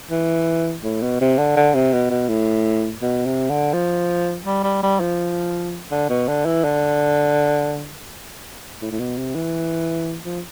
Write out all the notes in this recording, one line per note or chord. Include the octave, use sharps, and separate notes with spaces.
E3
A2
B2
C3
D3
D3
C3
B2
B2
A2
B2
C3
D3
F3
G3
G3
G3
F3
D3
B2
D3
E3
D3
A2
A2
B2
C3
E3
F3